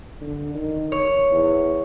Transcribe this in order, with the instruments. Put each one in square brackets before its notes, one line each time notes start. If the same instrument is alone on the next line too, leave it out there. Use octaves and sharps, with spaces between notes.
[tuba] D3
D#3
[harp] C#5
[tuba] E2